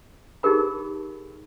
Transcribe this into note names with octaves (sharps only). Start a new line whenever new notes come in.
D#4 G4 G#4 A#4 B5